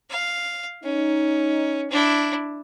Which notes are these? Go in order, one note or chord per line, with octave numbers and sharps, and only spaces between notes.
F5
C#4 D#4
D4 E4